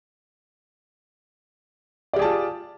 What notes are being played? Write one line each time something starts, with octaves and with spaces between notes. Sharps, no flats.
F4 G4 G#4 D5 A5